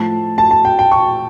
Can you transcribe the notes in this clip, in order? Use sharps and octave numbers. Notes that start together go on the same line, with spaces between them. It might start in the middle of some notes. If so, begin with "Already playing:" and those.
Already playing: A2 F3 A3 A5
A5
A5
G5
G5
C#6